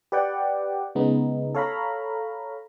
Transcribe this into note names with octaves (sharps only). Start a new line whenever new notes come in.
G4 B4 D5 F#5 G5
C#3 G#3 B3 D#4
A4 C#5 F5 A#5 B5